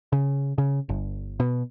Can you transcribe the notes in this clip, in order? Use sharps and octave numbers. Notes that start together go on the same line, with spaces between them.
C#3
C#3
G1
B2